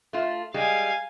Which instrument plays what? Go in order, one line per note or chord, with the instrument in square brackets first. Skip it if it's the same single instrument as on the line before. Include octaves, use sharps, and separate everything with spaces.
[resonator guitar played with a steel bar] A3 F4
[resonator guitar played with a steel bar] G3 G#3 [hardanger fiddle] F5 G#5